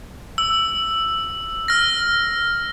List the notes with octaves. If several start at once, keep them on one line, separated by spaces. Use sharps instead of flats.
E6
F6 A#6